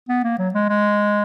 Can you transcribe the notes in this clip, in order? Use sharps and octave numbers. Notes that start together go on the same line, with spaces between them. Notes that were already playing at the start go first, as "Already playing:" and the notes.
B3
A#3
F#3
G#3
G#3